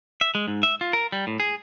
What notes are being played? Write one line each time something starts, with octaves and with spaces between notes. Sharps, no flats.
E5
G#3
G#2
E5
F4
A#4
G3
A2
G#4